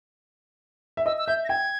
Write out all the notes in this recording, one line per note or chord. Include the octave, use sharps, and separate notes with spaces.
E5
D#5 E6
E6
E5 G6
A#6
G5 G#6